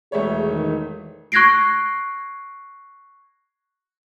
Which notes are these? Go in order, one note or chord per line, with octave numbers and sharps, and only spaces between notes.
E1 A3 G#4 C#5
D#3
C#6 F#6 G#6 A#6 C7 D7